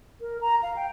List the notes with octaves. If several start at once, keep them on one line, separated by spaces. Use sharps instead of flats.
A#4
A#5
F5
G5